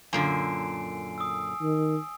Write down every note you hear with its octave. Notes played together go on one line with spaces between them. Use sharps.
F#2 A#2 D3 G#5 C7 D7
D#6 E6
D#3